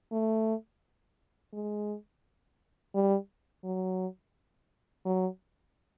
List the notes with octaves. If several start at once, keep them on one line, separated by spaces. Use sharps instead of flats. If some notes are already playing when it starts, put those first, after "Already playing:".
A3
G#3
G3
F#3
F#3